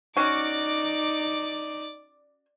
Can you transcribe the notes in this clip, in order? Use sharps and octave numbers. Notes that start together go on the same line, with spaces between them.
C#4 D#4 F#4 D5 D6